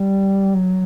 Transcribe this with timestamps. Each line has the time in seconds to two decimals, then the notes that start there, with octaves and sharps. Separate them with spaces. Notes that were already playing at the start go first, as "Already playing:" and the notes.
Already playing: G3
0.53 F#3